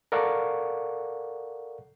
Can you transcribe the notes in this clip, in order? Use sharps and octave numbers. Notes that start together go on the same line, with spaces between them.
A4 A#4 D5 F5 F#5 C#6